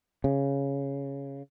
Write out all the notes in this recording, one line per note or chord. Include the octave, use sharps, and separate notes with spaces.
C#3